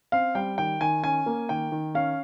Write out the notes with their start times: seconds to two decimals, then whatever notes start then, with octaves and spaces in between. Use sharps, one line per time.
0.12 C4 F5
0.35 G3 G5
0.58 D#3 G5
0.81 D#3 G#5
1.03 C#4 G#5
1.26 A#3
1.49 D#3 G5
1.72 D#3
1.95 C#4 F5